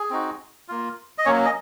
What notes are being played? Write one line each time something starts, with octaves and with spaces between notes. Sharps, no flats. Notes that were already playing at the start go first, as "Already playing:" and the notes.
Already playing: G#4
C4 D#4 F#4
A#3 F4
D#5
F#3 A#3 C#4 C#5
D#5